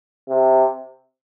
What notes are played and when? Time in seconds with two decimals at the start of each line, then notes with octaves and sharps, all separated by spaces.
0.29 C3